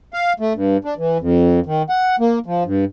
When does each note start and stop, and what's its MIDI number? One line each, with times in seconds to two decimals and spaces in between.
0.14 0.33 77
0.40 0.53 57
0.55 0.77 43
0.85 0.94 62
0.98 1.18 52
1.20 1.60 41
1.66 1.82 51
1.89 2.16 78
2.20 2.39 58
2.46 2.64 53
2.65 2.85 43